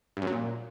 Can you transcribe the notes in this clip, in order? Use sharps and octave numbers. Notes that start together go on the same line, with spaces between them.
G2
F#2
F#3
A#2